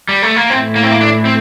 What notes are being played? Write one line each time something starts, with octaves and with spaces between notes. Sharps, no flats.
G3
A3
A#3
A2 E3 A3 C4 E4
A#3
C4
A#3
D4
C4